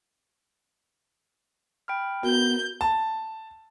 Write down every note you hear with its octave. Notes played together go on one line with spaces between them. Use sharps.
G5 B5 F6
B3 F#4 A#4 G6
A5